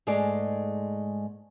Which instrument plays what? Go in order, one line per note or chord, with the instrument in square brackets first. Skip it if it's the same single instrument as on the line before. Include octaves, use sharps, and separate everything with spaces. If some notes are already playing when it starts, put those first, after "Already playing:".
[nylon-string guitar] G#2 G#3 A3 G#4 D5